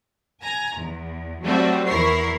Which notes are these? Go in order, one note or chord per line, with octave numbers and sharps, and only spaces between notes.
G#5 A#5
E2
F#3 G3 A3 C4 F#4
E2 E4 A#4 C#6 C7